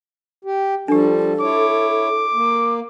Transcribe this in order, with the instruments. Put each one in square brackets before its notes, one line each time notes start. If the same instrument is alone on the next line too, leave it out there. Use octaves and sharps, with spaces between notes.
[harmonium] G4
[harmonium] F3 G3 [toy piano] D4 G4 [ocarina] A4
[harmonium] E4 C#5 [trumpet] D6
[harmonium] A#3